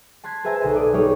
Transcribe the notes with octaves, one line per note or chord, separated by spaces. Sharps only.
A5 C6 F#6 G#6 B6
G#4 B4 C5 E5 G#5 A#5
B1 A4 D#5 G#5
D5 D#6
G3 D#4 G#4 C#5 D5